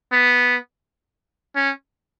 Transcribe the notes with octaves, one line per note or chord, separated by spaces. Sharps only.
B3
C#4